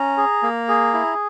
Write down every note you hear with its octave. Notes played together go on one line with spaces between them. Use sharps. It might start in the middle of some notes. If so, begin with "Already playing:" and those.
Already playing: C#4 A#5
G#4
A#3
G#4
E4